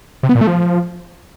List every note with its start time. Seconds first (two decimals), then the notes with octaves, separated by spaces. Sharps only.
0.23 C3
0.29 B3
0.35 A#2
0.41 A3
0.47 F3